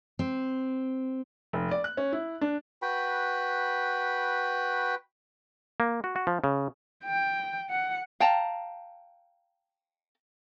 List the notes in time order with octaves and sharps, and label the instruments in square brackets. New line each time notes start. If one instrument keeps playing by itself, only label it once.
[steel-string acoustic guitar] C4
[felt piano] F1
D5
F#6
C#4
E4
D4
[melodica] F#4 B4 G5 B5
[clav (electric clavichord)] A#3
F#4
F#4
F3
C#3
[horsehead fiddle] G5
F#5
[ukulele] F5 G5 A5 A#5